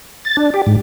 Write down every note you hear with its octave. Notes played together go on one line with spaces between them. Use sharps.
A6
D4
G4
G#2